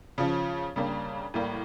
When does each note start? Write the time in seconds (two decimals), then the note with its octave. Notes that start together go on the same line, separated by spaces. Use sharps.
0.18 C#3 F3 C#4
0.76 C#3 G3 A#3 D4
1.34 A2 G3 A#3